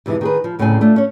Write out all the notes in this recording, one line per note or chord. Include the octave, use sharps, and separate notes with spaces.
F2 C3 E3 G#3 E4
D#3 G#4 B4
F3
D2 A2 C#3 C4 D#4 G#5
A3 D4 F4
C#4 C#5